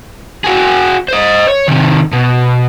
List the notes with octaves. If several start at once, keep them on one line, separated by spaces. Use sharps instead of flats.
F#4 G#4
C5 D#5
C#5
C3 D#3
B2